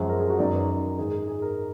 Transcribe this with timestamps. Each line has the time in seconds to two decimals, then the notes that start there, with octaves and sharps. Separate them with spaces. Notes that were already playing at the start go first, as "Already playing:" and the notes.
Already playing: F#2 F3 G#3 G#4
0.09 A#4
0.19 G#4
0.30 F#4
0.39 F#2 D#3 G#3 D5
0.50 D5
0.54 B4
0.69 A#4
0.98 G#2 D#3 G#3 G#4
1.28 G#4
1.42 A#4